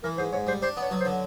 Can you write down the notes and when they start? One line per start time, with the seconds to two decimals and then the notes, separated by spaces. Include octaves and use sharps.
0.03 E3 A#4
0.17 G#2 C5
0.32 G#2 C#5
0.47 G3 C5
0.62 D4 C5
0.77 B3 C#5
0.91 F#3
1.00 C5
1.05 D3